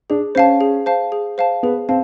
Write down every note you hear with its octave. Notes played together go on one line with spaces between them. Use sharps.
D4 G#4
C#4 C5 F5 A5
G#4
C5 F5 A5
G#4
C5 F5 A5
B3 G#4
C4 F5 A5